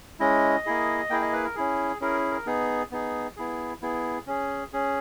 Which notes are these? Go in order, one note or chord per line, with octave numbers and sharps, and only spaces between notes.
G#3 C#4 E4 D#5
A#3 E4 G#4
A#3 E4 G#4 G5
D#5
B4
A#4
C#4 E4 G#4
C#4 E4 G#4 A#4
A#4
B3 D#4 G#4
B3 D#4 G#4
B3 E4 G#4
B3 E4 G#4
C#4 G#4
C#4 G#4